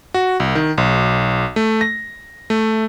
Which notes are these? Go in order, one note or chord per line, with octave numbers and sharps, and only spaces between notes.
F#4
C2
D#3
B1
A3
A#6
A3